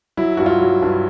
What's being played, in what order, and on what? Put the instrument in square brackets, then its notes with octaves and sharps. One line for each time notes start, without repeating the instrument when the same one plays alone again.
[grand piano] F#3 E4
G2 F#4
F4
F#3
G2